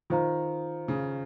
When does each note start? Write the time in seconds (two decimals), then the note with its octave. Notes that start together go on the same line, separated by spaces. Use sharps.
0.10 D#3 F4 C5 F5 A#5
0.88 C#3